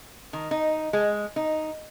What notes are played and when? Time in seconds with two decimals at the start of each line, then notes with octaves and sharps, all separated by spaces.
0.33 D#3
0.51 D#4
0.93 G#3
1.36 D#4